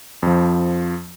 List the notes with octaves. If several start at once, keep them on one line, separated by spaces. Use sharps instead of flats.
F2 F3